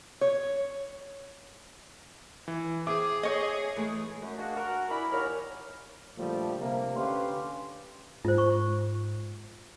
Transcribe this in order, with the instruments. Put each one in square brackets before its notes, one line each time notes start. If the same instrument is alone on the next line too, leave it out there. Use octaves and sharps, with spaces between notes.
[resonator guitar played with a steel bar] C#5
[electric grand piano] E3
[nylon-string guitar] C4 [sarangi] G#4 [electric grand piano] E5 D6
[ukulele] C#5 D#5
[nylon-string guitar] E3 G#3 A3
[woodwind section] F#2
G#3 A#3 D4 F#4
F#4 A#4
E4 D5 G#5 B5
D#2 A#2 D#3 A#4 C#5 F6
[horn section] A#2 D3 F3 G3 A3
C3 A#3
D3 C#4 G4 B4 F5 C6
[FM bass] G#2 [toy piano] F4 C5
[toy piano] C#6